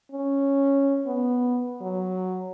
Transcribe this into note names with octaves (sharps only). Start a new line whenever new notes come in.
C#4
B3
F#3